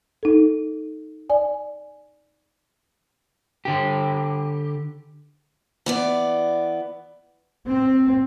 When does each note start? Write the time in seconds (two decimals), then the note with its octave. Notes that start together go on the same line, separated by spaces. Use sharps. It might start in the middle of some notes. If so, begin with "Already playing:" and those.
0.23 D#4 A4
1.30 D5 G#5
3.65 D3 G4
5.86 E3 B3 D5
7.67 C4